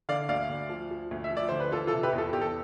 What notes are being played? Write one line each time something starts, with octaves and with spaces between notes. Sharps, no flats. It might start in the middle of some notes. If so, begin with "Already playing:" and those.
D3 D5 F5
D2 D5 F5
D2
F3
F3
D2
E5
F3
D5
D3 C5
B4
E3 F4 A4
F4 A4
C3
G4 B4
E2
F4 A4
E2 G4
A4